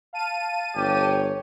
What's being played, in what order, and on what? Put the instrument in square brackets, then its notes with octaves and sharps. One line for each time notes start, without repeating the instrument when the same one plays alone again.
[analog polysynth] F5 A5 D#7
[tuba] G1 [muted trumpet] G4 [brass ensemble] C#5